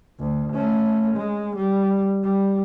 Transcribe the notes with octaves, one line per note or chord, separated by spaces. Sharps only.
D2
A3 C#4
G#3
G3
G3